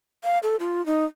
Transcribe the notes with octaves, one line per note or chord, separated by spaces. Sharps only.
F5
A4
F4
D#4